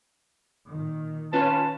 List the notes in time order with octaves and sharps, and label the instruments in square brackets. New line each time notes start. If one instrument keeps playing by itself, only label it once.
[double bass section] A#2 D#3
[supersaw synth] C#4 F4 B4 [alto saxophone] A5